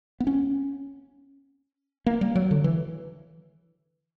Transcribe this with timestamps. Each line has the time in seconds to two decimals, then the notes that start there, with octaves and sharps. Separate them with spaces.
0.20 B3
0.27 C#4
2.06 A#3
2.21 G3
2.35 F#3
2.51 D3
2.64 E3